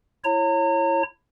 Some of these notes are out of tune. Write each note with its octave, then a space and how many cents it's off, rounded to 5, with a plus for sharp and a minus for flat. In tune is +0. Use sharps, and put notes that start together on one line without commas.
E4 +20 C#5 -20 A#5 -35